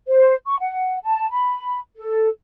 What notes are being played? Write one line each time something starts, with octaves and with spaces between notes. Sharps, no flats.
C5
C#6
F#5
A5
B5
A4